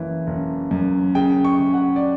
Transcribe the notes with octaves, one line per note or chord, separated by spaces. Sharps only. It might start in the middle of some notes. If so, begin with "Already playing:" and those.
Already playing: F#1 E3
F#1
F#2
C#3 G5
C#6
C#3
F#5
D5